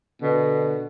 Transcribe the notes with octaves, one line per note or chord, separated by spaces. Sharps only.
B2 D3